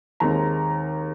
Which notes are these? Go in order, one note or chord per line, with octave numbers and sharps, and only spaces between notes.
D#2 D#3 G#3 C4 A#5